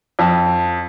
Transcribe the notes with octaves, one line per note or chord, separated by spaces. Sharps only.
F2